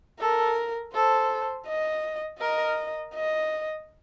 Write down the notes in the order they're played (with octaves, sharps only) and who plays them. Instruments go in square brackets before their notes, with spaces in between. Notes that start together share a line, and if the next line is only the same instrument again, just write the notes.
[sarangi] A4 [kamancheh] A#4
[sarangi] A4 [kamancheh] C5
[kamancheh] D#5
[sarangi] A#4 [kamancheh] D#5
[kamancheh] D#5